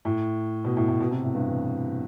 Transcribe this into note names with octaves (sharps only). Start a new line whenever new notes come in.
A2
B2
A2
A2
B2
C3
A2
G2
E3